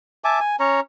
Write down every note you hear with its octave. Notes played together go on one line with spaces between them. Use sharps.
E5 G#5 A5 D6
G#5
C#4 C#5 A#5